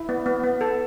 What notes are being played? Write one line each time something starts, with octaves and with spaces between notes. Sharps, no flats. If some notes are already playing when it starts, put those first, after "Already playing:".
Already playing: E4
B3
B3
B3
A4